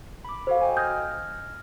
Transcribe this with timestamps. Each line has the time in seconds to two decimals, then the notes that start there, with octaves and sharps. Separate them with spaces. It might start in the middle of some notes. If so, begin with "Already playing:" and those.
0.25 B5 D6
0.47 F#4 A4 C5 F5
0.61 D#5 G5 G#5
0.77 D#6 F6 G6 G#6 A#6